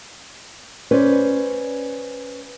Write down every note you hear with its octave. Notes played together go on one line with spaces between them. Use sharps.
C#4 B4 C5 D5